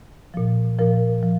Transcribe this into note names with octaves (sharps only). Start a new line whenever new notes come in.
A#2 F3
A#2 F3 A#4
F3